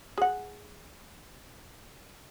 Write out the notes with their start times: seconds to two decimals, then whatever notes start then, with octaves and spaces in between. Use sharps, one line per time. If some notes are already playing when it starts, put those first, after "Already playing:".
0.18 G#4 F#5